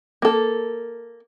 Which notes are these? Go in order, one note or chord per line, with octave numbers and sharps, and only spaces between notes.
A#3 A4